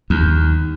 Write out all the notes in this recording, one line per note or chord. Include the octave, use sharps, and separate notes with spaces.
D#2